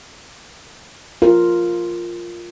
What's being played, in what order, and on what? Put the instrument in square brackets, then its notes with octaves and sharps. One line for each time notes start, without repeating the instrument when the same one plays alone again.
[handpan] F4 A#4